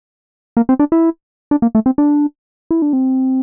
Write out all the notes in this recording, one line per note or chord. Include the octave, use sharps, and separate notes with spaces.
A#3
C4
D4
E4
D4
A#3
A3
C4
D4
E4
D4
C4